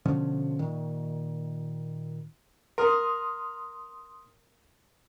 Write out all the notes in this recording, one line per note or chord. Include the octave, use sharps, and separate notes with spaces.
B2 D3 F3 C#4
A#2 D#3
A#4 C6 D#6